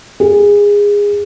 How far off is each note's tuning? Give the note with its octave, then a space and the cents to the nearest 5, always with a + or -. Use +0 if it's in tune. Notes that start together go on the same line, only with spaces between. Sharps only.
G#4 -20